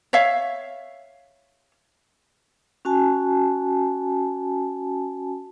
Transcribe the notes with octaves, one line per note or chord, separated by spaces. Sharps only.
C#5 E5 F5
C#4 F#4 G#5 A5